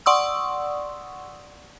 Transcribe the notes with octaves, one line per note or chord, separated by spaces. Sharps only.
D5 F#5 C6 C#6 D#6 E6